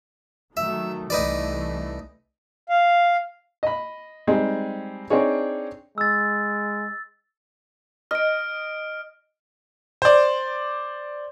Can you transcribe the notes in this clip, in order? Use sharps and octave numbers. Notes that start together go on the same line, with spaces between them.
D#3 F#3 A3 E5
C2 E3 A3 D#4 B4 D5
F5
D#5 B5
G3 G#3 C4 D#4 G#4
C4 D4 D#4 G#4 C#5
G#3 E6 A6
D#5 F6 D7
C5 D5